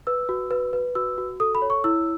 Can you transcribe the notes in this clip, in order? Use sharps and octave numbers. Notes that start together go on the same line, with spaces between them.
B4 E6
F#4
B4
B4
F#4 E6
F#4
A4 D#6
B5
C#5
C#6
E4 E6